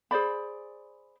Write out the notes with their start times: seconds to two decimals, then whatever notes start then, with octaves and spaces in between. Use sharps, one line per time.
0.11 G#4 C5 D5 B5